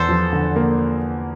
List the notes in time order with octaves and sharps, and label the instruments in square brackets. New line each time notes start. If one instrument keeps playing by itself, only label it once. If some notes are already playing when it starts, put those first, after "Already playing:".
Already playing: [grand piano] E2 [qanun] A4 C5
[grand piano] F3
D3
A#3